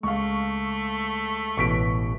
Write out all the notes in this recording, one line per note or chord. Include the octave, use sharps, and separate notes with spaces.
C#2 A3 F5 C#6
A1 B2 E3 C#6 B6 D7